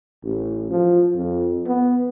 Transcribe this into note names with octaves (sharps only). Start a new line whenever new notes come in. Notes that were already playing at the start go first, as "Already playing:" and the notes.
A1
F3
F2
B3